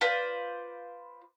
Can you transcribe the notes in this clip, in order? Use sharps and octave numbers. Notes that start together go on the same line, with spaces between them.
F4 B4 C5 D5